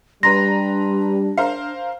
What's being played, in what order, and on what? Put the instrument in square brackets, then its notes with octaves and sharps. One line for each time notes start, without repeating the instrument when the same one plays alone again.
[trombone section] G3 [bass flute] D4 [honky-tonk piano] B4 A#5 C6 [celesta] A#6
[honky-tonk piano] A#4 C5 F5